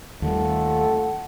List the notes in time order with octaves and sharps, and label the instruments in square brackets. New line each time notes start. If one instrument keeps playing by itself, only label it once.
[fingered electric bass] D#2 D#3 G3 [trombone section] A3 F4 A4 [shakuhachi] F#5